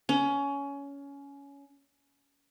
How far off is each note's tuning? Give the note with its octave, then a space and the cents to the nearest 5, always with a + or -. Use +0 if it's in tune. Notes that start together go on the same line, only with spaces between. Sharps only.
C#4 +20